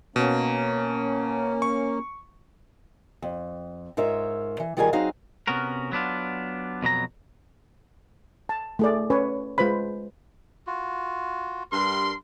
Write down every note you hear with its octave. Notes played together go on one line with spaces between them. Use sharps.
B2 A#3 C#4
C#6
F2
G#2 F4 A#4 C#5 E5
E3
D#3 G3 F4 G#4 A#4 G#5
F#3 C4 D#4 F#4 G#4 F5
C3 B3 C#4 F#4 A#4
F#3 B3 D4 F4
F2 B2 F#3 A#5
A5
A3 G#4 D5
C#4 B4 C#5 G#5
G#3 F4 B4 C5 B5
F4 F#4
G2 A#4 C6